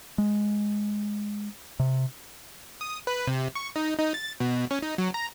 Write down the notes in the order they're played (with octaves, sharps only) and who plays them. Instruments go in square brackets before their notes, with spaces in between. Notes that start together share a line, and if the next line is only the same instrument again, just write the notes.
[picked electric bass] G#3
C3
[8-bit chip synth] D#6
B4
C3
C#6
D#4
D#4
A6
B2
C#4
D#4
F#3
A#5